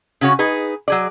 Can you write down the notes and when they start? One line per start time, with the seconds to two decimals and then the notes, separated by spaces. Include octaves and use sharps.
0.21 C#3 C#4 F#4 C#5
0.39 D#4 G#4 B4
0.88 F#3 G#4 D5